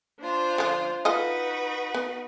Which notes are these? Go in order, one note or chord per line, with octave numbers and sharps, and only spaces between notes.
D4 F4 C5
D3 F3
D#4 F4 F#4 A4 B4 D#5
B3